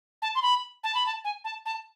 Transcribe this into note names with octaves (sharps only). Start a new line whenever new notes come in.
A5
C6
B5
A5
B5
A5
G#5
A5
A5